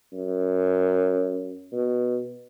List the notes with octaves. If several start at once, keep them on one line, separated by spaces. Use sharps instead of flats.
F#2
B2